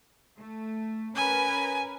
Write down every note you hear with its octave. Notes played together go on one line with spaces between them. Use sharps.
A3
C#4 A#4 B4 G#5